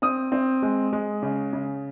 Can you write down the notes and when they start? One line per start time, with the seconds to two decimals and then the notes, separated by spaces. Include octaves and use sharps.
0.02 C4 D#6
0.32 C4
0.62 G#3
0.93 G#3
1.22 C#3
1.53 C#3